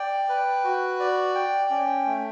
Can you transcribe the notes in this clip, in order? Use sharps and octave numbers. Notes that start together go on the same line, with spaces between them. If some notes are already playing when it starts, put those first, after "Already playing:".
Already playing: D5 G5
B4
F#4
D5
G5
C#4
A3